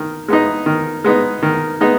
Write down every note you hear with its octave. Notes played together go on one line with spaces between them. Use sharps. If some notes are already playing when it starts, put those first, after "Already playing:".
Already playing: D#3
G#3 B3 D#4
D#3
G#3 B3 D#4
D#3
G#3 B3 D#4